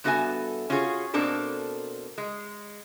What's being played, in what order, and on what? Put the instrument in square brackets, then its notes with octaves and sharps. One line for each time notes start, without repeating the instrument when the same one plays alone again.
[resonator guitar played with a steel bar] G2 B3 F#4 A4 E5 G#5
C#4 F4 F#4 G#4 C#5
B2 A#3 C4 D4 A4 A#4
G#3